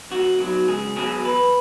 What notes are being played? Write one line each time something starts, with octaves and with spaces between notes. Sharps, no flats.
E2 F#4
B2 F#3
C#2 G#4
B2 F#3 G#4
E2 B4